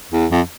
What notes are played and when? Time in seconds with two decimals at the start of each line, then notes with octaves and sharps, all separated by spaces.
0.12 E2
0.31 F2